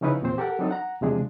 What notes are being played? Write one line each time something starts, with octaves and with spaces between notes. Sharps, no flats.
C#3 F3 C#4 D#4 E4 B4
E2 A#2 C4 C5
G4 A4 A#4 F#5
F#3 C4 D4 D#4 A4
F#5 A#5
E2 C3 F3 G#3 D4 G#4